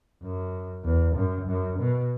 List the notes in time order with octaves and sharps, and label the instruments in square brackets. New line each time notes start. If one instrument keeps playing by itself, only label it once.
[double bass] F#2
E2
F#2
F#2
B2